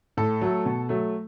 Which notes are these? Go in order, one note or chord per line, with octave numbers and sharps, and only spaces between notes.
A2 A4
F#3 A3
B2
F#3 A3